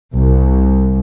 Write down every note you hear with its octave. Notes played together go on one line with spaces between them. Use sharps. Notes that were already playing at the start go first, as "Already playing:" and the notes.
C2